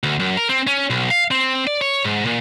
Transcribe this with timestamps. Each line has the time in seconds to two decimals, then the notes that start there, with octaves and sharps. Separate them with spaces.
0.03 D2
0.20 F#2
0.37 A#4
0.49 C4
0.67 C#4
0.90 B1
1.10 F5
1.31 C4
1.67 D5
1.81 C#5
2.05 G#2
2.26 A#2